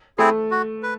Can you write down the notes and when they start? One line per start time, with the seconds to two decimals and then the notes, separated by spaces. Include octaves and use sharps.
0.18 A3 C4 E4 G#4
0.51 F#4
0.83 B4